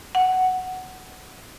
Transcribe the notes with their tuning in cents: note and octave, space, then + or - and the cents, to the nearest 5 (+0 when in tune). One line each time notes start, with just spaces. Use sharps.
F#5 +5